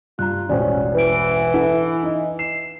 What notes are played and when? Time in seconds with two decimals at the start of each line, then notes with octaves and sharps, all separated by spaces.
0.19 G2 F4 A#5 F#6
0.49 E1 A1 C#4 C5 D5
0.94 E3 B4 D7
1.54 E4 A4 F#5
2.02 D#4 D#5
2.39 C7 E7